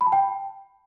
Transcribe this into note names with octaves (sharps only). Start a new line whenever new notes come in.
B5
A5
G5